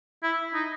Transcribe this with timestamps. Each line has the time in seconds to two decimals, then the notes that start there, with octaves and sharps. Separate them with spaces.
0.23 E4
0.54 D#4